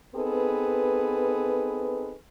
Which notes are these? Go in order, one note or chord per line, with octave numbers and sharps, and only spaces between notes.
B3 C4 D#4 G#4 A4 B4